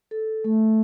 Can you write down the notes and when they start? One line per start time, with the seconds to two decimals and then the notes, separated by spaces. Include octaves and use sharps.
0.11 A4
0.44 A3